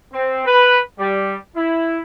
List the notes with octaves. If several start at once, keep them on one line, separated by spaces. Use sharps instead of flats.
C4
B4
G3
E4